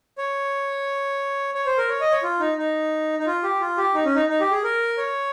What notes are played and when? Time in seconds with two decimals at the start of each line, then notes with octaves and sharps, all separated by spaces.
0.18 C#5
1.55 C#5
1.66 C5
1.78 A#4
1.89 C#5
2.01 D#5
2.12 C#5
2.23 F4
2.40 D#4
2.58 D#4
3.19 D#4
3.27 F4
3.43 G4
3.61 F4
3.77 G4
3.94 D#4
4.05 C#4
4.15 D#4
4.29 D#4
4.40 G4
4.51 G#4
4.64 A#4
4.98 C#5